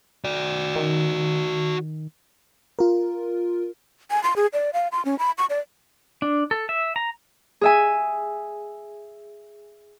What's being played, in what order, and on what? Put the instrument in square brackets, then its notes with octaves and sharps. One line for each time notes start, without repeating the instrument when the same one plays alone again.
[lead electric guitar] F#4 D5
[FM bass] D#3
[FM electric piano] F4 A#4
[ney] G#5
C6
G#4
D5
F5
C6
C#4
B5
C#6
D5
[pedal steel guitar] D4
A4
E5
A#5
[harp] G#4 E5 G#5